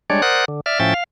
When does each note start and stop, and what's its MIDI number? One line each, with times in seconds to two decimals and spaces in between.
0.10 0.22 55
0.10 0.22 56
0.10 0.22 62
0.10 0.22 73
0.10 0.22 74
0.22 0.45 70
0.22 0.45 72
0.22 0.45 74
0.22 0.45 78
0.22 0.45 87
0.22 0.45 90
0.48 0.60 50
0.66 0.79 74
0.66 0.79 76
0.66 0.79 89
0.80 0.94 45
0.80 0.94 53
0.80 0.94 61
0.80 0.94 76
0.80 0.94 79
0.80 0.94 93
0.94 1.04 77